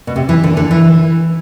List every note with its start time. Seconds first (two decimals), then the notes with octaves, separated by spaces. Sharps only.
0.07 B2
0.16 C3
0.29 E3
0.44 D3
0.57 D3
0.71 E3